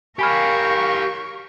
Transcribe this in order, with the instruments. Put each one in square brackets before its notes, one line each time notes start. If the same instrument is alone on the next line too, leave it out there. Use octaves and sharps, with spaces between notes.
[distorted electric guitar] G4 C#5 [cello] A#4 F5 [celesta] G#5 B5 F6 [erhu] C#6